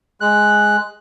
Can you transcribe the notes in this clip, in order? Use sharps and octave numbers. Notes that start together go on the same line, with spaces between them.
G#3 F#6